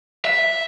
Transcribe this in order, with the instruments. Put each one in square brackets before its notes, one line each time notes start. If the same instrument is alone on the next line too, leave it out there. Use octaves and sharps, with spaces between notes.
[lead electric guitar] E5